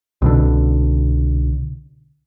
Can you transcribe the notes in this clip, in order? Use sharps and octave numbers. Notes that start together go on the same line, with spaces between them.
C2 B2 D3